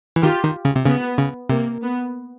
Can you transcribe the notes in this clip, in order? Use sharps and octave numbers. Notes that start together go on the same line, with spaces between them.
E3
D#3 F4 G4
D#3
C#3
C3
C#3 B3
C#3
C3 A#3
B3